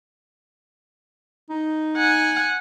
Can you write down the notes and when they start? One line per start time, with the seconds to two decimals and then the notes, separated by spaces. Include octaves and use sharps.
1.50 D#4
1.97 F#5 G#5